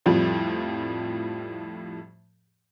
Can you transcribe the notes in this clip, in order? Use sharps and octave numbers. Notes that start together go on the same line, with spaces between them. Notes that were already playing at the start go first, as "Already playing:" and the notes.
F2 A2 F3 G3